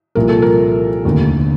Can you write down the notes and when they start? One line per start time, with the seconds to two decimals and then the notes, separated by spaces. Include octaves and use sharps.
0.15 C2 A#2 F3 A#4
0.29 A4
0.42 A#4
1.05 F1 D#2 D3